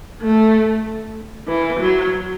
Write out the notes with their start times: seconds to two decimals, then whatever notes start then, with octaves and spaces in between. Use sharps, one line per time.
0.22 A3
1.48 E3
1.80 F#3